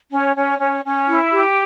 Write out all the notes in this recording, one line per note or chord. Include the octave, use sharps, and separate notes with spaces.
C#4
C#4
C#4
C#4
E4
G4